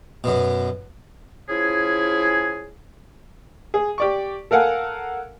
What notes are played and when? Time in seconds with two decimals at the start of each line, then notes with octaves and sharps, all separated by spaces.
0.24 F#2 B2
1.50 F3 C#4 E4 G#4
3.74 G#4
3.98 G4 D5 C#6
4.51 A4 A#4 F5 F#5 G#5